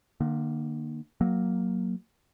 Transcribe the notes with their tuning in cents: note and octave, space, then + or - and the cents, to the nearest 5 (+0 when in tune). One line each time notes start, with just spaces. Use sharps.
D3 +45 A#3 +5
F#3 +0 A#3 +0